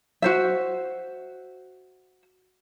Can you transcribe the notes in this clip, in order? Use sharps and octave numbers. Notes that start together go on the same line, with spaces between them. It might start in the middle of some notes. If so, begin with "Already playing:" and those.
F#4 C5 E5